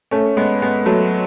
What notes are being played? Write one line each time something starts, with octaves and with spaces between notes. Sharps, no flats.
A3 C#4
G#3 B3
G#3 B3
F#3 A3